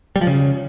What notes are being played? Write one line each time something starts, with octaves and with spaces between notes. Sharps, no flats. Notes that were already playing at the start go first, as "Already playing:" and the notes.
G3
F3
C#3